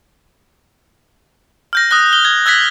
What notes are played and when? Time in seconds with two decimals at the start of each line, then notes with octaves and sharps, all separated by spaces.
1.73 F6 G6 A#6
1.91 D#6 F6 F#6 A#6
2.13 G7
2.25 G#6
2.46 E6 F#6 G#6 A#6 B6